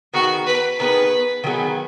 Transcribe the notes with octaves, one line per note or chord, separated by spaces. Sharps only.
D#3 B3 F#4 G#4
B4
D#3 B3 G#4 B4
D#3 F#3 B3 G#4